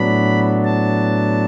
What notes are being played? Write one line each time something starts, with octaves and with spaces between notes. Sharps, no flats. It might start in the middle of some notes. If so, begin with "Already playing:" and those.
Already playing: A2 F#3 B3 D4 B5
A5